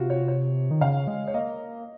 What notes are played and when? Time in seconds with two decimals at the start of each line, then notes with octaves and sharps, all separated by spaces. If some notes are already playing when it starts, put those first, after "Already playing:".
Already playing: C3 F4 F#4
0.10 C#5
0.28 C#5
0.71 D#3
0.81 C#3 F5
1.07 G#3
1.28 C#5
1.34 A#3 D#5